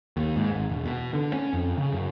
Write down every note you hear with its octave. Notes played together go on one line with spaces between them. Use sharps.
D#2
G#2
G#1
E1
B2
D3
C#4
F2
C#3
F#2